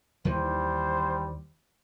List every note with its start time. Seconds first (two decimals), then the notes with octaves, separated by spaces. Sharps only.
0.25 D#2 D#3 E3 G3 C5